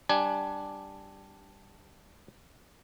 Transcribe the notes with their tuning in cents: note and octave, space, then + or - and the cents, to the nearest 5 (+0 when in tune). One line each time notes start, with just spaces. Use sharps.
G3 +0 D4 +0 G#5 +15